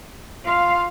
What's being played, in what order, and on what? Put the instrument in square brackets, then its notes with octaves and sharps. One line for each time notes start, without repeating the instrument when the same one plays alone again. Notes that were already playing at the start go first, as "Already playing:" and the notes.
[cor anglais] F4 [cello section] F5